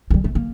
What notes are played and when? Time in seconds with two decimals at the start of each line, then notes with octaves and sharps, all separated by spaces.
0.10 F3
0.14 G3
0.24 A3
0.35 A#3